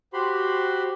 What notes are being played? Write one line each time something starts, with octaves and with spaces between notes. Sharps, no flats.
F#4 G4 C5 B5 C6